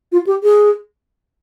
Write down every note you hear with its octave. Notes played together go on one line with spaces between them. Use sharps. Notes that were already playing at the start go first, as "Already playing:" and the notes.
F4
G4
G#4